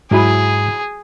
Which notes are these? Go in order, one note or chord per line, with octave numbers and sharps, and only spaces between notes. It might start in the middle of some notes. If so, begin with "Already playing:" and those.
G#2 F#3 E4 G#4 B5